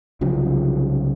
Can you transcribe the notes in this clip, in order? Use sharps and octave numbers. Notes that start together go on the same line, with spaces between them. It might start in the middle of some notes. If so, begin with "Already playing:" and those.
C2 C#3 F3 F#3